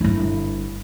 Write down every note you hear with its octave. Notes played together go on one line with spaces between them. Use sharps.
G1 E4